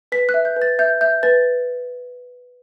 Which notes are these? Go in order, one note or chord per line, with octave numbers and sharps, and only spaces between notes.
B4 B6
F#6
E5
G6
B4
A6
E5 G6
E5 G6
B4 A6